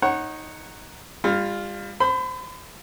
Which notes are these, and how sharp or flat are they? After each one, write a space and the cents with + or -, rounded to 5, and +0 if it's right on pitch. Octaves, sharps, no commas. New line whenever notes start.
D#4 +0 C#5 -25 F#5 +5
G3 +35 F4 +0
C5 +0 B5 +35